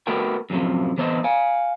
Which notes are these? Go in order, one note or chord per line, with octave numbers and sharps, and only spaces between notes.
A3 B3 F#4 A#4 G5
F#2 A2 C3 F3
E3 B3 C5 D5 D#5
F5 G#5